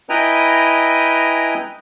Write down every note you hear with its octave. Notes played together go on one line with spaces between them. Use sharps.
E4 B4 D#5 G5 G#5 A#5